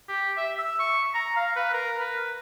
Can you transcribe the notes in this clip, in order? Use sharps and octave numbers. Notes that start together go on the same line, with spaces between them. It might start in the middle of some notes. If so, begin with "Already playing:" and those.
G4
E5
E6
C#6
A#5
F5
B4
A#4
B4